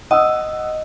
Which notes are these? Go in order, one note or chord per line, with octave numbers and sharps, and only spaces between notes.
D#5 F#5 D#6 E6